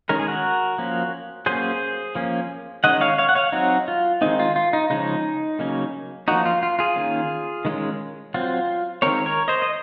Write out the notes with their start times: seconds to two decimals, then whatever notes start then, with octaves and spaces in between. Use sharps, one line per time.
0.09 D#3 G#3 C#4 A#4
0.20 G#4
0.28 F#4 A#4
0.78 F3 A#3 C#4
1.46 F#3 A#3 C#4 G#4 C5
2.15 F3 A#3 C#4
2.84 D#3 G#3 C#4 D#5 F#5
3.01 C#5 F5
3.18 C#5 F5
3.29 F#5
3.35 C#5 F5
3.52 F#3 C4 D#4 F#4
3.88 F4
4.21 D#3 G#3 C4 D#4
4.39 F4
4.56 F4
4.73 D#4
4.90 C#3 F3 G#3 C#4 D#4
5.59 C#3 F#3 A#3 C#4
6.28 F3 A#3 C#4 D#4 F#4
6.46 F4
6.63 F4
6.79 F4 G#4
6.96 D#3 A#3 C#4
7.65 D#3 G#3 C#4
8.34 F#3 C4 F4
9.02 D#3 G#3 C4 A#4 C#5
9.26 A#4 C#5
9.48 C5 D#5
9.62 D#5